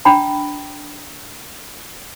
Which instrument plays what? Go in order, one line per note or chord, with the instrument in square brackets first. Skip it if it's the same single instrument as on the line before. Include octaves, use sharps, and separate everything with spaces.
[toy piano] D4 G5 A#5 B5